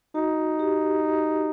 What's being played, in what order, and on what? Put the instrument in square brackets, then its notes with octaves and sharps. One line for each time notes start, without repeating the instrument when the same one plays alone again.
[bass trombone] D#4 [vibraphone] F#4
[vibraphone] G4